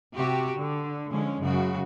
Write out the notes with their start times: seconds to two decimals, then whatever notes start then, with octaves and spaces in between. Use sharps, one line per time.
0.16 C3 F#4 G4
0.56 D3
1.10 D3 F3 G#3 C#4
1.39 F#2 C#3 F#4